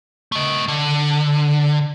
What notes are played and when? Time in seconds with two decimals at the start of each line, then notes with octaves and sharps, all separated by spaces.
0.32 A3 D#5
0.68 D3